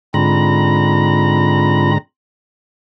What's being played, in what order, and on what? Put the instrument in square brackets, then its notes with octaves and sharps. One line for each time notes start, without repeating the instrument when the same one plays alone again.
[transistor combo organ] G#2 D3 A#5 [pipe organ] C4 F4 B5